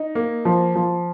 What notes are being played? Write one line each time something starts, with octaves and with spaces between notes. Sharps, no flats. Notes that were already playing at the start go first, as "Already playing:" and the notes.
Already playing: D#4
A#3
F3
F3